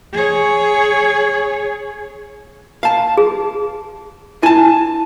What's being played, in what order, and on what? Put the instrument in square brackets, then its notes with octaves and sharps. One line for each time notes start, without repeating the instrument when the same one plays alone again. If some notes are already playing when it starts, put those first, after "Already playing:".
[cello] G#4 C#5
[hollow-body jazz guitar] F5 A5
[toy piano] G#4
[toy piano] E4 [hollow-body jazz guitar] G#5 A5